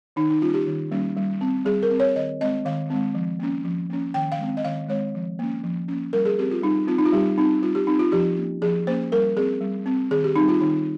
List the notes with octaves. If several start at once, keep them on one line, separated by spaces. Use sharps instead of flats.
D#3 D#4
D#4
G3 A#3 C#4 F4
G4
D#3
G3 A#3 C#4
G3
C4
G3 G#4
A#4
C4
C#5
D#3 D#5
G#3 C4 D#5
D#3 F5
G#3 C4
F3
A#3 C#4
F3
A#3 C#4
D#3 G5
F5
G#3 C4
D#5
D#3 F5
G#3 C4 C#5
F3
A#3 C#4
F3
A#3 C#4
G3 A#4
G#4
C4 G4
F4
G3 D#4
C4 F4
D#4
F4
G3 G4
C4 D#4
G3 F4
G4
C4 D#4
F4
F3 G4
A#3 C#4
F3 G#4
A#3 C#4 C5
G3 A#4
C4 G#4
G3
C4
D#3 G#4
G4
G3 C4 D#4
F4
D#3 D#4